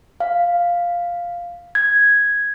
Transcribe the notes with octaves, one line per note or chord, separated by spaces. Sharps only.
F5
G#6